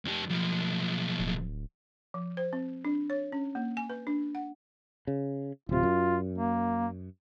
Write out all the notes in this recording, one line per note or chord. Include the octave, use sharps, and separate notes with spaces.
F2 G4
B1 F3
D1
F3
C5
C4
D4
C#5
C#4
A#3
G#5
B4
D4
F#5
C#3
D1 C3 F4
F#2
A#3